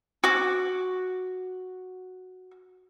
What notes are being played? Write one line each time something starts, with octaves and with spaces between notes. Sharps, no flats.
F#4 D6